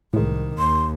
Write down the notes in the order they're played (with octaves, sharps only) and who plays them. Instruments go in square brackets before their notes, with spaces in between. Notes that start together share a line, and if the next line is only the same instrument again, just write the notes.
[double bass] C2 D#3 [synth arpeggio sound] A2 G#3
[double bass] D#2 [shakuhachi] C6